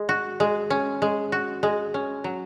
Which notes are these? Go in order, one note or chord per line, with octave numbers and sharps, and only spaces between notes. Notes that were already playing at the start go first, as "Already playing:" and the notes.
Already playing: G#3
F#4
G#3
C#4
G#3
F#4
G#3
C#4
F#3